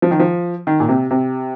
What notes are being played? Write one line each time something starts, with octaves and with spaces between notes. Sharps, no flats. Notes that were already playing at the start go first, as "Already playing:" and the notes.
F3
D#3
F3
D#3
A#2
C3
C3